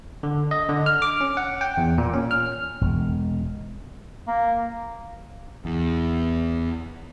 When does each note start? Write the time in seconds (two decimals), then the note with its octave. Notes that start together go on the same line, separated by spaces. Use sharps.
0.23 D3
0.51 D#5
0.69 D3
0.86 F6
1.02 D6
1.21 C#4
1.37 F#5
1.61 G5
1.77 E2
1.98 A#2
2.14 C#4
2.31 F6
2.81 E1 G#3
4.28 A#3
5.65 E2